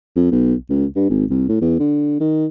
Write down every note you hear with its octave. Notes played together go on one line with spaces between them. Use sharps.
F2
B1
C#2
G2
G#1
C2
A2
E2
D3
D#3